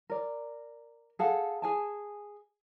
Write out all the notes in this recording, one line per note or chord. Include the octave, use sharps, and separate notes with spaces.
A#4 D5
G#4 A4 F5 F#5
G#4 G#5 A5